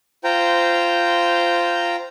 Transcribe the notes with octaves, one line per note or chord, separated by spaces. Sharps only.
F4 C5 G5 A#5